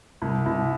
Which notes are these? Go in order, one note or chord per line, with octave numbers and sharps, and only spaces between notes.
C2
C2